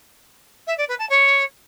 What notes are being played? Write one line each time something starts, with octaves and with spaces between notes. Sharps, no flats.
E5
D5
B4
A5
C#5